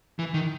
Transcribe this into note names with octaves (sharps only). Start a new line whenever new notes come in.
E3
D#3